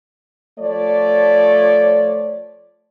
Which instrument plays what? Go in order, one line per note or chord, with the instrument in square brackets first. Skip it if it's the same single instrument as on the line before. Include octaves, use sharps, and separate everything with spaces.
[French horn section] F3 A3 C#5 D5